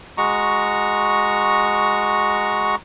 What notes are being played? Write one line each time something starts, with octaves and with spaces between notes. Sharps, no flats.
G#3 F#4 A#5 C#6